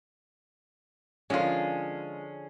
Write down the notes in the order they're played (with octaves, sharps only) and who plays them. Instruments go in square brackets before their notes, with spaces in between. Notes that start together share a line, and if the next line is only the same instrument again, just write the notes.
[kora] D3 F3 A#4 [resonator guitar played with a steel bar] G#3 F4 [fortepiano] C#4 G#4